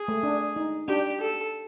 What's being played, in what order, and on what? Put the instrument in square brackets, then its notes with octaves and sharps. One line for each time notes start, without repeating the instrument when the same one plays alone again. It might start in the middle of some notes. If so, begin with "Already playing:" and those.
Already playing: [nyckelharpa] G#4
[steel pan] A3
D4
D#4
[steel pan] D4 [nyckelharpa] G4
[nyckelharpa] A4